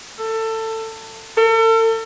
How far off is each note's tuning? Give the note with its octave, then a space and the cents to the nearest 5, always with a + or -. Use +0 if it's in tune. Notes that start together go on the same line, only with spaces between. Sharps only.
A4 +20
A4 +40